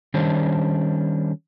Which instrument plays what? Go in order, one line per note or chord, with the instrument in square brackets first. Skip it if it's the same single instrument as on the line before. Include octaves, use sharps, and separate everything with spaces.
[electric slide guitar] D#3 G3 C#4 D4 C5